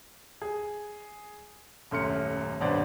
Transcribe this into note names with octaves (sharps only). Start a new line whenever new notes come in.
G#4
D#1 F#2 A3 C6 F6 C#7
D#1 G2 B2 C5 D5 F#5